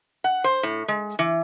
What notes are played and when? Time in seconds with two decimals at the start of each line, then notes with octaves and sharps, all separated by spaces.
0.24 F#5
0.44 C5
0.63 A2
0.88 G#3
1.19 E3